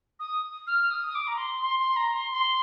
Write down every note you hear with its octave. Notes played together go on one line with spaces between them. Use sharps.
D#6
F6
D#6
D#6
D6
A#5
C6
C6
C6
A#5
C6
C6